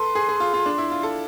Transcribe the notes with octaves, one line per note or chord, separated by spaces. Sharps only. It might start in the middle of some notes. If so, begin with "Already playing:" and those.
Already playing: A4 B4 C6
G#4
G#4
F4
F4
D4
E4
F4
A4